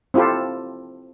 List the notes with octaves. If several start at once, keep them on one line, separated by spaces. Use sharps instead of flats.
C4 E4 F4 G4 A4